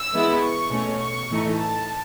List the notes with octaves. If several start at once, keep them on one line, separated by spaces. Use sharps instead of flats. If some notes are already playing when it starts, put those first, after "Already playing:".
Already playing: E6
E3 G#3 B3 E4
C#6
B2 A3 C#4
C#6
A2 E3 A3 D#4
A5